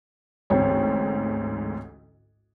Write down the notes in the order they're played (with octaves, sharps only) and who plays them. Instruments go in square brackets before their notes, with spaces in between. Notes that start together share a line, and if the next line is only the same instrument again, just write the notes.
[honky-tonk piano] A1 D2 G#2 [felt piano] C4 C#5